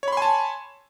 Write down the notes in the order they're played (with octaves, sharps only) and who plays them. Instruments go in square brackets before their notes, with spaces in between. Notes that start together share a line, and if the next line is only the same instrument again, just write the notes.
[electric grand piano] C#5
B5
C6
G#5
A5